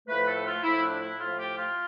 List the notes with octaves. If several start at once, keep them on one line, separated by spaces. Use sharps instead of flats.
A2 F3 A3 B4
A4
F4
A2 F3 A3 E4
D4
E4
A2 F3 A3 F4
G4
F4